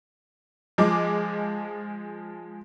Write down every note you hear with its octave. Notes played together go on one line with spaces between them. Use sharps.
F3 G#3 D6